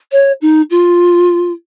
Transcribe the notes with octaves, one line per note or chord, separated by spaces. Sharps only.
C#5
D#4
F4